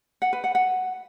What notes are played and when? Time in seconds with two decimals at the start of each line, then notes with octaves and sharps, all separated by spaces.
0.22 F#5
0.33 B4
0.44 F#5
0.55 F#5